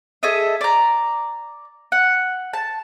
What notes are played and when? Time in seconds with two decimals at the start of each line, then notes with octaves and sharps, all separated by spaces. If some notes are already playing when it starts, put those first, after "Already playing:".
0.23 G#4 A4 D#5 E5
0.61 D5 A#5
1.92 F#5
2.53 A5